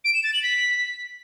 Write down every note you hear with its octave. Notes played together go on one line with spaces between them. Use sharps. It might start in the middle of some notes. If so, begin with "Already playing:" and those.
D7
E7
A6
F#7
B6